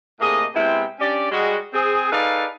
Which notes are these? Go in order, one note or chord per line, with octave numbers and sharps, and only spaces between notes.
A2 C3 A#3 G#4 D#5
C3 G#3 B3 E4 G5
C#4 D4 G4 D5
G3 G#3 F#4
C4 G#4
D#4 G#4 A4 B4 D5 F5